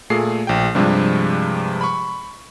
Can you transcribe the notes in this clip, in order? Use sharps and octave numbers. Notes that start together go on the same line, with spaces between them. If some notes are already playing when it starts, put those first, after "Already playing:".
A#2 A3 G#4 C7
A#1 G5
G2 C3 F3 G3 G#3 D4
B5 C#6